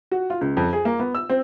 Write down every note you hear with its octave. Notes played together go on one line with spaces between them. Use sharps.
F#4
F4
C#2
F2
G#4
A#3
B3
E6
C4